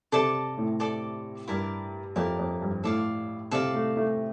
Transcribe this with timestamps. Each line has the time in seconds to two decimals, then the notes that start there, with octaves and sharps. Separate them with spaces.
0.12 C3 A4 D5 A5 D6
0.58 A2
0.80 A4 D5 A5 D6
1.48 G2 E4 A#4 D5 A5
2.16 F2 E4 A#4 D5 A5
2.39 F2
2.62 G2
2.84 A2 A4 D5 F5
3.51 C3 A4 D5 F5
3.74 A3
3.97 A3